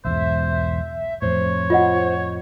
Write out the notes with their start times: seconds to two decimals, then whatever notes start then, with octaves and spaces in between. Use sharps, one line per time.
0.05 B1 E2 G#2 C5 E5
1.22 F2 A2 C5 C#5
1.70 F4 D#5 F#5